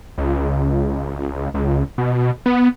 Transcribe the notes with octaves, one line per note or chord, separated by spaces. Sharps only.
C#2
C#2
B2
B3